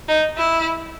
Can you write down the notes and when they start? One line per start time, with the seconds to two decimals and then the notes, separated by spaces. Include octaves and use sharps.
0.08 D#4
0.38 E4